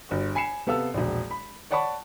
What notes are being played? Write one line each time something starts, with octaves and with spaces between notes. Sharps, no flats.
G1 F#4
G#5 B5 C7 C#7 E7
C3 B3 A4 F5 E6
E1 A#1
B5
C#5 D5 F#5 A5 B5 C#6